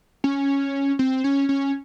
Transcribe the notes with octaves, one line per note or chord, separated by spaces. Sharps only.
C#4
C4
C#4
C#4